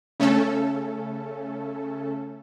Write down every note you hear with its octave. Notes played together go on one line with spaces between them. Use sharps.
C#3 A3 C#4 A4